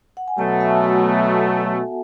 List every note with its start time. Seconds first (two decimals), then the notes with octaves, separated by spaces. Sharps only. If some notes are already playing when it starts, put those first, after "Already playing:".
0.17 F#5
0.28 G#5
0.38 B2 F#3 A3 F#5 A5
0.61 E5 G#5
0.83 F#4 A4
1.05 B3